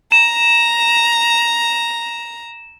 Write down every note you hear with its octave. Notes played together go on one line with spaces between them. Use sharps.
A#5 E7